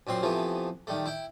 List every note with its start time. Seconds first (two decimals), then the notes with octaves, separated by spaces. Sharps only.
0.07 F#2 A#2 C4 C6
0.22 C3 E3 F3 A3 B3
0.87 D#3 G3 A3
1.06 E4 G5